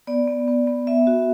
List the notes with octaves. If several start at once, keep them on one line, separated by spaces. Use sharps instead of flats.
B3 D5
B3
B3
B3
B3 E5
F#4